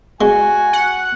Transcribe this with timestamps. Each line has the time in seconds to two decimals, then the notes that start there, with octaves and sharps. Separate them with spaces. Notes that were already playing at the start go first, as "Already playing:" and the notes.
0.21 G#3 F#4 G#5
0.73 F#5